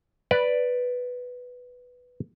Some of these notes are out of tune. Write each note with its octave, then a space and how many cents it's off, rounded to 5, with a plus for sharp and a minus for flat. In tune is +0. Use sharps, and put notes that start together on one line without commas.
B4 +0 D5 +0